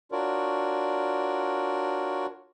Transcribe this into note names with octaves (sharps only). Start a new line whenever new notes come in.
D4 F4 F#4 A#4 C#5 D5